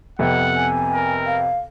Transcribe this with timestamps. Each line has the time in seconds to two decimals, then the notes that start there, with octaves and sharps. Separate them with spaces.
0.19 F2 C3 B3 F#5
0.56 G#5
0.94 A#4
1.26 F5